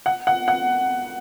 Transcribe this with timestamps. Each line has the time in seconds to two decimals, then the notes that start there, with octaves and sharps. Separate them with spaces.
0.06 F#5
0.27 F#5
0.48 F#5